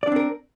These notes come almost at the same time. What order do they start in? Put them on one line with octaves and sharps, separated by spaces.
D5 D4 C4 A#4